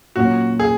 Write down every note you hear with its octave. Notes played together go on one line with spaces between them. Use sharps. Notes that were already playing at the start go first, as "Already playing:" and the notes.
A#2 F#3 A#3 C#4 F#4
G#4